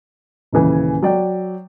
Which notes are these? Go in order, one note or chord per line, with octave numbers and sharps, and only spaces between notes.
D#1 C#3 E3 G#5
F#3 D5 G5